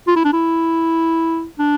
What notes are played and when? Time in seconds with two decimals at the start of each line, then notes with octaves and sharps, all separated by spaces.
0.07 F4
0.16 E4
0.25 D4
0.33 E4
1.59 D4